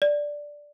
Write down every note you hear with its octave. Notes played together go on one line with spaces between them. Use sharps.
D5